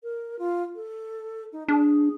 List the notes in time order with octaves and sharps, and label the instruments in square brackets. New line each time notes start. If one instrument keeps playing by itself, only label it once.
[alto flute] A#4
F4
A4
D#4
[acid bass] D4 [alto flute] G#4